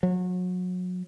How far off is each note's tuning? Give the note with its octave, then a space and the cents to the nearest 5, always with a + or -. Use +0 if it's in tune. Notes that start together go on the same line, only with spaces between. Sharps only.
F#3 -30